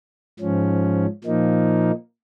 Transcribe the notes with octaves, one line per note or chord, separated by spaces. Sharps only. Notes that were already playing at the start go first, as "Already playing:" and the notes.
G#2 F3 C#4
A#2 F3 A#3 D#4